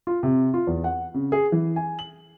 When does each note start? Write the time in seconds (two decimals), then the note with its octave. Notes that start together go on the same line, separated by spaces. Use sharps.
0.07 F4
0.23 C3
0.54 F4
0.67 E2
0.84 F#5
1.14 C#3
1.32 G#4
1.52 E3
1.76 G#5
1.99 F#7